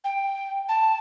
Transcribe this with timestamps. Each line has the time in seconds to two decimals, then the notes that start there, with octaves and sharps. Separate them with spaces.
0.04 G5
0.69 A5